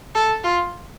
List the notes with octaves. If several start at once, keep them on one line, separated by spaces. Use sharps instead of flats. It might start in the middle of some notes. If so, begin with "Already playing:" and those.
A4
F4